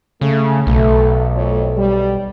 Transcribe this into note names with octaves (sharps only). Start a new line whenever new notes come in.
C#3 A3
B1 A3
F2 A3 C#5
G3